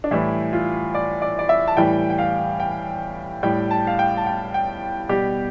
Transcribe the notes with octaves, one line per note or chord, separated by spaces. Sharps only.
D4
A2 E3 G3 E4
F4
D5
D5
D5
E5
A5
A2 E3 G3 G5
G5
F5
G5
A2 G3 G5
A5
F5
G5
A5
G5
G5
B2 G3 G4